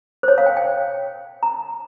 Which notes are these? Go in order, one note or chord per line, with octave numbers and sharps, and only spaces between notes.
C5
C#5
F5
G5
G5
A#5